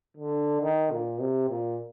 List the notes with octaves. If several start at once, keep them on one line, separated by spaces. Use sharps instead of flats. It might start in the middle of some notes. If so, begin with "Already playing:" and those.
D3
D#3
A#2
C3
A#2